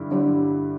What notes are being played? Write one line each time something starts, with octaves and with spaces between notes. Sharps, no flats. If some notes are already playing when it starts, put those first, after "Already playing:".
Already playing: G2 D3 G3 E4
G2 D3 G3